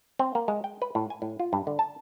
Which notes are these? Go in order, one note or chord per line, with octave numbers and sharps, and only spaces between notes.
C4
A#3
G#3
G5
B4
A2
G#5
A2
F4
G2
D3
A5